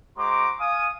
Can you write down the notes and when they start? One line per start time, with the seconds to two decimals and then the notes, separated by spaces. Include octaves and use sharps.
0.17 G#3 F#4 C5 A#5 C6 D6
0.59 F5 G#5 D#6